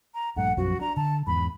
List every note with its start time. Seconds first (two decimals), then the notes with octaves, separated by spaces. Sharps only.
0.14 A#5
0.36 A#1 G2 A3 F#5
0.57 B1 F#2 F3 F#4
0.81 D4 A#5
0.97 D3 A5
1.27 E2 G#2 B5